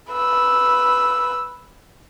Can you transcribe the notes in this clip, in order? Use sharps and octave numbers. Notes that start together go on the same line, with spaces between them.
B4 E6